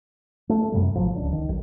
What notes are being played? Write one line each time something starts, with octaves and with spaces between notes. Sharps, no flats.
A3
F#2 C3 G3
A1 F3 F#3
D1 C#2 D4
D#3
B1